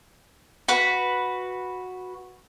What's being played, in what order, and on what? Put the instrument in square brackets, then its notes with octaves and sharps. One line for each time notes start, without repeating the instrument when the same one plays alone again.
[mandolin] F#4 B4